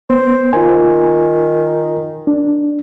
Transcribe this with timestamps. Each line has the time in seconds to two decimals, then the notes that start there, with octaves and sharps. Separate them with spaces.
0.10 B3 C5
0.53 D#3 F4 G#5
2.27 D4